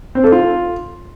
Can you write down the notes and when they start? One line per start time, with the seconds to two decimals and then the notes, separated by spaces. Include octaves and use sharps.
0.15 C4
0.24 A4
0.32 F4